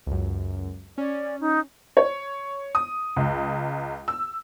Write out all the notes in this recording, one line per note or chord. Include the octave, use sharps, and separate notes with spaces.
C#2 F#2
C#4 D5
D#4
C#5
D#6
C#2
E6